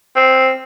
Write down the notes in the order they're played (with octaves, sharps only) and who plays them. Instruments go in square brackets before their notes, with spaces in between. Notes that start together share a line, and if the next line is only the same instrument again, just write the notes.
[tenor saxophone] C4